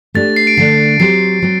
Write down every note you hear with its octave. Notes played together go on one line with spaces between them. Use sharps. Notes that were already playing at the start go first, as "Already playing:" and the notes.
A3 D4 G4 A6
C7
D7
D3 A3 D4 C7
F#3 C4 G4 C5 C7
F#3 C4